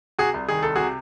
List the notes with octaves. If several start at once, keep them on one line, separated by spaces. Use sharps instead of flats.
C3 F#4 G#4
C2
D#3 G#4
C2 A4
C3 F#4 G#4